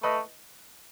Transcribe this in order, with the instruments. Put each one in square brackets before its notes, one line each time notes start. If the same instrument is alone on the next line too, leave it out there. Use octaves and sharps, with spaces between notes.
[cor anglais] A3 [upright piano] B4 D#5